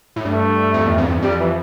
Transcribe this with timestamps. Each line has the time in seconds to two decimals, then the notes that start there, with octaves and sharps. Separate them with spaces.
0.16 A2
0.24 G2 A3
0.74 F2
0.86 E2
0.98 F2
1.10 F2
1.22 F2 G3
1.39 E3